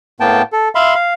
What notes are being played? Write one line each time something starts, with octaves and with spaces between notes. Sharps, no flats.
A2 A#3 B3 G5 A5
A4
E5 F5 B5 C6
F5